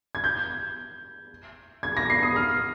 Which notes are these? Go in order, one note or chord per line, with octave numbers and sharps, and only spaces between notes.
G#6
G6
G#6
A#6
C7
D#6
F6